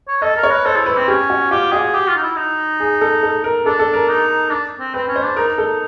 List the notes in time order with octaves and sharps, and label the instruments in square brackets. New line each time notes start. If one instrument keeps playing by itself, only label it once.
[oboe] C#5
[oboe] A4 [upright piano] D#5
[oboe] A#4
[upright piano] C#5
[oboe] B4
[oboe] A4 [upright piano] C5
[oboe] E4
[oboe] E4 [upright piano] B4
[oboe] C4
[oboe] C#4 [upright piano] G4
[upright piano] F#4
[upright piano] F4 [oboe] G4
[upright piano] F#4 [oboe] G#4
[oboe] G4
F4
D#4
E4
D#4
[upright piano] G#4
A4
A4
A#4
[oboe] D4 [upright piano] A4
[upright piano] A4
A#4
[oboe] D#4
D4
C4
[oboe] C4 [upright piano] B4
[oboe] C#4
[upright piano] C5
[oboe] D4
[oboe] D#4 [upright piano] A#4
[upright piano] A4